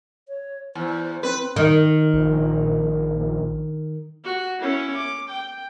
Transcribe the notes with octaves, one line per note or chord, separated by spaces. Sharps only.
C#5
E2 C5
C4 B4
D#3
A#1
F#4
C#4 E4
D6
G5